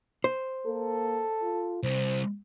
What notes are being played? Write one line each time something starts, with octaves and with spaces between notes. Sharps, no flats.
C5
A#3 A4
F4
C2 C5